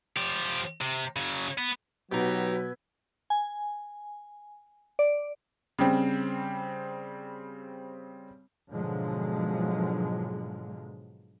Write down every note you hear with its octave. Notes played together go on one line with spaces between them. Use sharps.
F3 G4
C3
C#3 F#3
B3
B2 F#3 D#4 F#4 G4 B4 E6 G#6
G#5
D5
C#3 G3 C4
G#2 B2 D3 F3 F#3 G#3